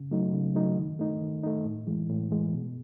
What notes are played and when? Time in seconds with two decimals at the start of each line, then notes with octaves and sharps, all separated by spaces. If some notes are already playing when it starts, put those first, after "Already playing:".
Already playing: C#3
0.11 F#3 A3 D#4
0.33 C#3
0.55 F#3 A3 D#4
0.77 D#3
0.99 A3 D#4
1.21 D#3
1.43 A3 D#4
1.65 A2
1.87 E3 G#3
2.10 A2
2.31 E3 G#3
2.54 B2